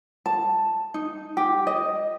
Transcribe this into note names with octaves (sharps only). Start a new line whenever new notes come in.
A5
D#4
G4
D#5